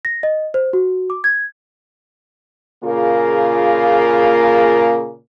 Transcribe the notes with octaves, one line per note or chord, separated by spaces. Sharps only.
A#6
D#5
C5
F#4
D6
G#6
A#2 C#3 A#3 F4 G#4 A#4